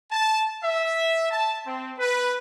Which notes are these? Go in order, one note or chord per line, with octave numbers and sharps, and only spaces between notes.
A5
E5
A5
C4
B4